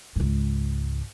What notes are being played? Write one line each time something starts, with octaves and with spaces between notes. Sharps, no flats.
C#2 G#2